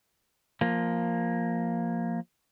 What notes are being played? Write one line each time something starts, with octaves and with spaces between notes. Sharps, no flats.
F3 A#3